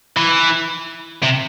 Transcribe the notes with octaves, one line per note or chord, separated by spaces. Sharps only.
E3
C3